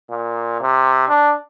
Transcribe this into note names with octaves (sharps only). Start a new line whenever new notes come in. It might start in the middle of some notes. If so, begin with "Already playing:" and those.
A#2
C3
D4